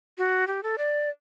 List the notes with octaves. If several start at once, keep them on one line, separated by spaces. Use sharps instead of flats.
F#4
G4
A4
D5